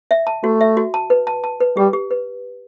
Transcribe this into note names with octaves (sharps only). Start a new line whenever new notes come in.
E5
A5
A3 F#4
E5
F#4
A5
B4
A5
A5
B4
G3 G4
G4
B4